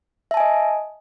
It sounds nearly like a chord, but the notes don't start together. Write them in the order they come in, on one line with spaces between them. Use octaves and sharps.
E5 A5 G#5 D#5